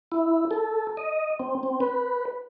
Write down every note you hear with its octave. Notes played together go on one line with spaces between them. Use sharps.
E4
A4
D#5
C4
C4
B4